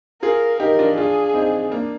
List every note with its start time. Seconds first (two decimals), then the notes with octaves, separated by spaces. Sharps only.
0.22 F4 G#4 A#4
0.60 D#4 G4 A#4
0.79 D4 F4
0.97 D4 F4 G#4
1.34 C4 D#4
1.71 A#3 D4